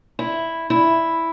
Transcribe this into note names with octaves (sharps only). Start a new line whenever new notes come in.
E4
E4